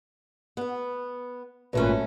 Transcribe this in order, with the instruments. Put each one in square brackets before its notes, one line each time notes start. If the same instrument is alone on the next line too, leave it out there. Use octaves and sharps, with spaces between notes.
[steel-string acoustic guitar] B3 B4
[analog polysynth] G#1 A#2 B4 [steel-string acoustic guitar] F#2 A3 C#4